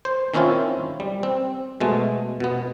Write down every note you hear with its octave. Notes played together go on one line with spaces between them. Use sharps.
C5
D#3 C4 C#4 E4 F4
G3
C4
B2 G#3 A3
B2 B3